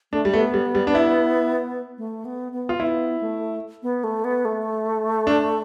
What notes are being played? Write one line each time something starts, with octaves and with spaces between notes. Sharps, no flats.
A3 D4
G3
A3 B3
G3
G3
D4
E4
A3
B3
B3
F4
B3 E4
A3
B3
A3
B3
A3
D4